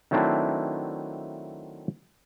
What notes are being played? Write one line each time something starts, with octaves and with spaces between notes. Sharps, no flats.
D#3 F#3 A3 C4 D4 E4